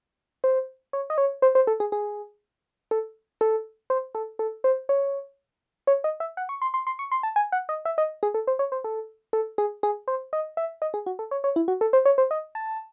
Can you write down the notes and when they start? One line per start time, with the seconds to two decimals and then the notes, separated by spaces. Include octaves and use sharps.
0.44 C5
0.93 C#5
1.10 D#5
1.18 C#5
1.42 C5
1.55 C5
1.67 A4
1.80 G#4
1.92 G#4
2.91 A4
3.41 A4
3.90 C5
4.15 A4
4.39 A4
4.64 C5
4.89 C#5
5.87 C#5
6.04 D#5
6.20 E5
6.37 F#5
6.49 C#6
6.62 C6
6.74 C6
6.87 C6
6.99 C#6
7.12 C6
7.23 A5
7.36 G#5
7.52 F#5
7.69 D#5
7.85 E5
7.98 D#5
8.23 G#4
8.34 A4
8.47 C5
8.59 C#5
8.72 C5
8.84 A4
9.33 A4
9.58 G#4
9.83 G#4
10.08 C5
10.33 D#5
10.57 E5
10.82 D#5
10.94 G#4
11.06 F#4
11.19 A4
11.31 C#5
11.44 C#5
11.56 E4
11.68 F#4
11.81 A4
11.93 C5
12.05 C#5
12.18 C5
12.31 D#5
12.55 A5